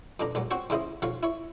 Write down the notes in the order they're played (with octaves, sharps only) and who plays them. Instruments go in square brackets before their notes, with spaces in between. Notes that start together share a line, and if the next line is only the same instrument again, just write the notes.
[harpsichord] F2 B2 D4 A#5
A#1 A#2 F#3
C4 F#4 C5 C#5
E2 C#3 E4 C5 D#5
B1 F3 F#3 C#5 F5
E4 C#5